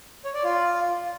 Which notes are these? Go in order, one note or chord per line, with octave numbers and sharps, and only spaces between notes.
C#5
D5
F4